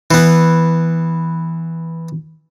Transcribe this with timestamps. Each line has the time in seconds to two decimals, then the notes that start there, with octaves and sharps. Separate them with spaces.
0.11 E3 B3